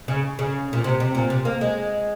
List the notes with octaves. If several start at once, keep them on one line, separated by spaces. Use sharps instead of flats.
C#3
C#3
A#2
C3
C3
A#2
C3
A#3
G#3